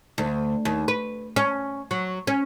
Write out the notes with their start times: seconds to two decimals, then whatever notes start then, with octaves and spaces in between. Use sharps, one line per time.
0.18 D2
0.65 D#2
0.88 B4
1.36 C#4
1.91 F#3
2.27 C#4